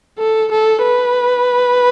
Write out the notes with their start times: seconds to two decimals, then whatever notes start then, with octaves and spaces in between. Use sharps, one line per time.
0.19 A4
0.51 A4
0.83 B4